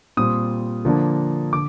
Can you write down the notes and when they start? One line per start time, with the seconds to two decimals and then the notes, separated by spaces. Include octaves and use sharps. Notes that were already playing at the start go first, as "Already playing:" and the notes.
0.17 A#2 G3 C4 D#6
0.85 D3 F3 A#3 D4
1.53 D3 D6